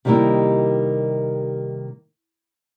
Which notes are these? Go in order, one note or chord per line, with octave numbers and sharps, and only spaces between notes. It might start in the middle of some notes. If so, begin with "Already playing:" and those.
C3 D#3 G3 A#3 D#4 E4